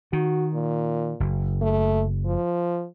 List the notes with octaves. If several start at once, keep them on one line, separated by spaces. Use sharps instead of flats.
D#3 F#4
A#2
F#1
A3
F3